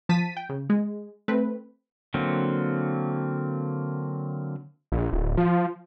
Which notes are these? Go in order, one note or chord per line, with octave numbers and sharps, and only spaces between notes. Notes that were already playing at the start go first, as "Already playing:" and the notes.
F3 A5 B6 D#7
G5
C#3
G#3
A3 C4 B4
D3 F#3 A#3 C4
A#1
D1
F3